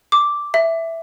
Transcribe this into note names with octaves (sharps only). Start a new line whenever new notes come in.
D6
E5